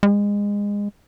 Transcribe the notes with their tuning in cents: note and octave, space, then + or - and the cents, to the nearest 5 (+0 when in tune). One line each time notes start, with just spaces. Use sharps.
G#3 -25